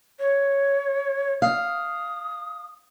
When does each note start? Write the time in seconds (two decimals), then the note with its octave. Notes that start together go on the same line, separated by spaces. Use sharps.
0.19 C#5
1.42 F5 D#6